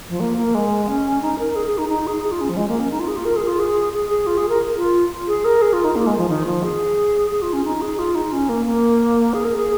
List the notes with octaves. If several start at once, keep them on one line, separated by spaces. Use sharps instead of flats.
F3
A#3
A#3
G#3
C#4
D#4
A#4
G#4
G#4
D#4
D#4
G#4
G#4
F4
C#4
F3
G#3
A#3
C#4
D#4
F4
G#4
F4
A#4
G#4
F4
G#4
G#4
G#4
F4
G#4
A#4
F4
G#4
A#4
G#4
F4
D#4
A#3
G#3
F3
D#3
F3
G#4
G#4
F4
C#4
D#4
G#4
F4
D#4
C#4
A#3
A#3
G#4
A#4
G#4